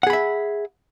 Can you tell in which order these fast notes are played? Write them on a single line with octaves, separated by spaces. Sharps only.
F#5 G#4 B5 E5